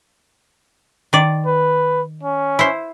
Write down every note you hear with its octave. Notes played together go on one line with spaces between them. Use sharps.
D#3 D5
B4
C#4
E4 C5